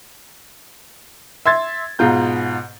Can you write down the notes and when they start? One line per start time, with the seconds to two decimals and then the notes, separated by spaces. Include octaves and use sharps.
1.46 E5 C6 G#6 A6
1.99 G#2 B2 F4 A#5 G6